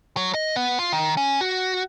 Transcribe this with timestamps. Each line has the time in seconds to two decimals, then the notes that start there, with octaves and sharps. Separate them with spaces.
0.17 F#3
0.34 D#5
0.56 B3
0.79 F4
0.92 D#3
1.17 C#4
1.41 F#4